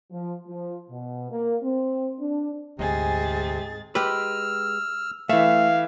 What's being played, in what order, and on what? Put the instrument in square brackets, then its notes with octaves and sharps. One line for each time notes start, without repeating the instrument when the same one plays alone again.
[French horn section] F3
F3
B2
A#3
C4
D4
[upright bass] D2 [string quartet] G#2 G#4 A6 [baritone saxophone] C3 [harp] D#5 G#5
[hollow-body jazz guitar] G#3 G4 B4 [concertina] E6 F6
[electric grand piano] E3 E5 [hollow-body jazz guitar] A3 [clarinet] F5